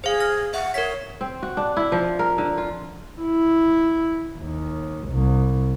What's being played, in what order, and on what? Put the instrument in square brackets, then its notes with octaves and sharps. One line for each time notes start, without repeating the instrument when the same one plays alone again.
[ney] G#4 [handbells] C5 F5
[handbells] F6 A#6
[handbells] E5 [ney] F#5
[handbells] A#4 B6 [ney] C#5
[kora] C4
F#4
D4
E4
F3
A#4
D3
F4
[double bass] E4
D#2
C2